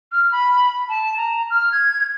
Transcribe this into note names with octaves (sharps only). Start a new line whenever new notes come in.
F6
B5
A5
A#5
F6
G#6